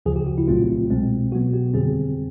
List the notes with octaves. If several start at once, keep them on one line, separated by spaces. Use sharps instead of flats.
D2 C#3 F3 G#4
G4
F#4
E4
C2 A#2 F#3 A3 C4 F4
C2 B2 G#3 C4
B2 F#3 B3 F#4
G4
F2 D3 G3 C4 G#4